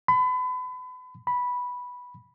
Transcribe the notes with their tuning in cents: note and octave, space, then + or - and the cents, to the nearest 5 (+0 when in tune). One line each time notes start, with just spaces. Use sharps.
B5 +35
B5 -5